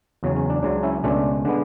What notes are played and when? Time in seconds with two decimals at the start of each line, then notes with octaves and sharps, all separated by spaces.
0.23 E2 C#3 F#3 C#4
0.36 C#4
0.50 D4
0.63 C#2 C#3 F#3 D4
0.83 C#4 E4
1.04 C#2 B2 A3 C#4 D4
1.45 D3 G#3 B3 D4